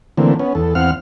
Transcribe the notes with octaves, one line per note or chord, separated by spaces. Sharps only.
D3 E3 A3 A#3 C4
B3 C#4
E2 A4
E2 C4 F5 F#5 F6